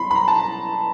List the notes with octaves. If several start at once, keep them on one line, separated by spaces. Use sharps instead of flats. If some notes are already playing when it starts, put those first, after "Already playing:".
Already playing: B2 F#3 B5 C6
B5
A#5
A5